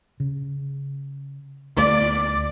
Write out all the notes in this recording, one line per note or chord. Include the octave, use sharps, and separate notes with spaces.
C#3
D2 A3 D5